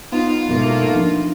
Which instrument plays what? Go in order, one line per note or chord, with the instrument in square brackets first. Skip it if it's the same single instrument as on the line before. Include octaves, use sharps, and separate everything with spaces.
[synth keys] B3 D#4 [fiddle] F4
[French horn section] D2 A3 A#3 [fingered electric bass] G#2 B2 F#3
[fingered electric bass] F3 D4